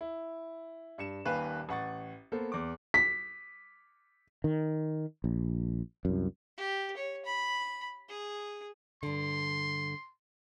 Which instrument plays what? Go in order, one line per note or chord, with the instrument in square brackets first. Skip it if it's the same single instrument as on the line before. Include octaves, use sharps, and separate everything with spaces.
[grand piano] E4
G2 C#7 E7
D#1 D#2 B4 F5 G#5
A1 F#5 C#6 A6
A#3 B3 A4 C5
E2 D6
B6
[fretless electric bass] D#3
A#1
C2 F#2
[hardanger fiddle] G4
C#5
B5
G#4
[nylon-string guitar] G2 D3 [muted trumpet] C6